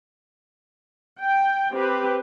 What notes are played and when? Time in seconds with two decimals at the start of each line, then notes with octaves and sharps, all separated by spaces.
1.18 G5
1.73 C4 G4 B4